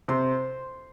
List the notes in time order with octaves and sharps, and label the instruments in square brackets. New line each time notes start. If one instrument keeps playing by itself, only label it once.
[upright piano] C3 [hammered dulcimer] C5